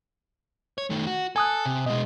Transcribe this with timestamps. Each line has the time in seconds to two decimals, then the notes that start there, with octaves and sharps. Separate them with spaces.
0.78 C#5
0.90 D#3 A3
1.07 F#4
1.36 A4 G#5 D#6 F#6
1.66 C3
1.86 B2 G#3 D#5